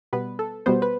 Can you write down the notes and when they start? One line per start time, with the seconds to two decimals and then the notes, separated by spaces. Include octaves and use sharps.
0.13 B2 G3 B3 B4
0.39 A4
0.66 B2 G3 B3 C5
0.82 B4